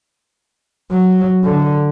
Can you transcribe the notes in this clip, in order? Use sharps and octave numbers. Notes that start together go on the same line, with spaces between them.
F#3
D3